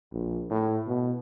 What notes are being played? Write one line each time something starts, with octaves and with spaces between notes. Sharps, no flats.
A#1
A2
B2